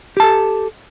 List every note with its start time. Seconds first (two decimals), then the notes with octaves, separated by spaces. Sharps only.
0.17 G4
0.20 A5
0.23 A4